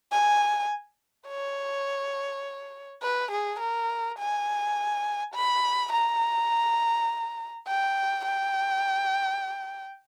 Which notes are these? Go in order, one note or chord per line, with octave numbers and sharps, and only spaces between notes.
G#5
C#5
B4
G#4
A#4
G#5
B5
A#5
G5
G5